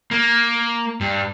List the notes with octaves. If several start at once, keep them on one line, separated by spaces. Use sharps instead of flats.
A#3
G2